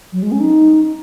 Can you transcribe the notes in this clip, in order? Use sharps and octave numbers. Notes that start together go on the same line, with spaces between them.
F#3
G#3
C#4
D#4